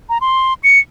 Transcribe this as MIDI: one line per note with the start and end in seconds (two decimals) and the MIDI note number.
0.09 0.18 82
0.21 0.54 84
0.64 0.79 97